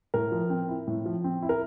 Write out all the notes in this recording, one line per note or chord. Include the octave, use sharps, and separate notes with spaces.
A2 A#4
F3
C4
E4
A2
F3
C4
E4
A#4